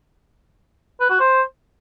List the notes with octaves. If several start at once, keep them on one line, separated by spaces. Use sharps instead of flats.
B4
F#4
C5